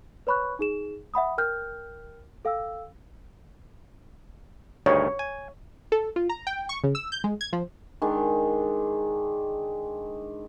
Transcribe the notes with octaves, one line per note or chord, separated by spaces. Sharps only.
B4 C#5 B5 C#6 F#6
D#4 G#4 E7
E5 F#5 B5 D#6
A#4 G5 F6 G6
A4 F5 G5 E6
D2 G2 D#3 C#5
G#5
A4
F4
A#5
G5
C#6
C#3
E6
G6
G#3
G#6
F3
D#3 G#3 D4